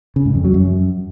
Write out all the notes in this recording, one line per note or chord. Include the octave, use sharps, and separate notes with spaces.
C#3
G#2
F2
F#3
F#2